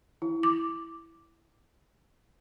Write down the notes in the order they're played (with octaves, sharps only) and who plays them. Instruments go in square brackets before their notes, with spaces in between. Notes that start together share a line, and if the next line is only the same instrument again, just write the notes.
[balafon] E4
D6